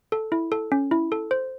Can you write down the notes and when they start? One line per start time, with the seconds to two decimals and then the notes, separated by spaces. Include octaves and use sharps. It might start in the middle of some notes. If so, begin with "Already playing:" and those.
0.12 A4
0.32 E4
0.52 A4
0.72 C#4
0.91 E4
1.12 A4
1.31 C5